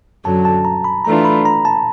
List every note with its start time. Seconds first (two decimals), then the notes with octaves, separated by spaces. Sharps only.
0.24 F#2 D3 F#3 A5
0.45 A5
0.65 A#5
0.84 B5
1.05 E3 A3 D4 F4 A#5
1.25 B5
1.45 A#5
1.65 A5